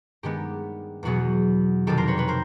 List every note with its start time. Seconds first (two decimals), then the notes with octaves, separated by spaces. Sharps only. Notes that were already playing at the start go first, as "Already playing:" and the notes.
0.23 G2 D#3 G#3 B3 G4
1.03 E2 B2 F#3 B3 F#4 G#4
1.87 F2 C3 D#3 G4 A4
1.97 A#4 C5
2.08 B4 C#5
2.18 B4 C#5
2.28 A#4 C5